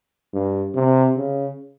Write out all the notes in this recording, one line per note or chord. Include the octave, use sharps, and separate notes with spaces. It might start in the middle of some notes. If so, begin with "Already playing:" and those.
G2
C3
C#3